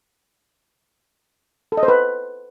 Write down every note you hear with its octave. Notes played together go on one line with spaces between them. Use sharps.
A4
D#5
C5
B4